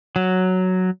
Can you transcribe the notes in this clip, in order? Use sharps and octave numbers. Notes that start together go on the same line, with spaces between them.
F#3